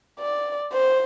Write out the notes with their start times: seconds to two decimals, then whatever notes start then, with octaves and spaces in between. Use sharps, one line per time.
0.19 D5
0.73 C5